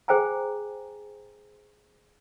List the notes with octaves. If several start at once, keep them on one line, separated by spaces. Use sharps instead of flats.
G#4 C5 G5 G#5 A#5